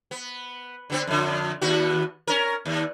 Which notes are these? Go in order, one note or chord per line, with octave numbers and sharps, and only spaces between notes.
B3
D3 B3 C4
F2 D3
D#2 B3 F#4
C#4 A#4
D#2